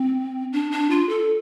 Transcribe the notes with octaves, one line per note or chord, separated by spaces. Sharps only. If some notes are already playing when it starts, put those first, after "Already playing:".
Already playing: C4
D4
D4
F4
A4